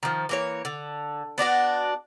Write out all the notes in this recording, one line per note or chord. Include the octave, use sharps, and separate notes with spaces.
D#3 F3
E3 A#3 C#5
D3
B3 D4 F#4 D5